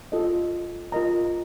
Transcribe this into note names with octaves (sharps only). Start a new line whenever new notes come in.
F4 A4 D#5
F4 A#4 D#5 A#5